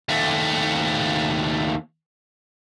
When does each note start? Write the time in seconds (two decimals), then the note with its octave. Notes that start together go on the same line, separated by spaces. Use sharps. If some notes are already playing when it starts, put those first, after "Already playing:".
0.09 D#2 A3